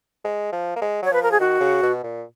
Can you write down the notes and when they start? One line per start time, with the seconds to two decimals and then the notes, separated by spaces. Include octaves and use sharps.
0.25 G#3
0.53 F3
0.76 A#3
0.82 G#3
1.03 F#3 C#5
1.11 F3 B4
1.23 A#4
1.32 G#4
1.40 D#3 F#4
1.61 C#3
1.83 B2
2.04 A#2